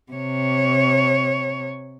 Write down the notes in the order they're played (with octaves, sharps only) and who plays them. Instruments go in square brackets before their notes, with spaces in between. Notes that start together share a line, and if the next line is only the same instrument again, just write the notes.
[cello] C3 C#5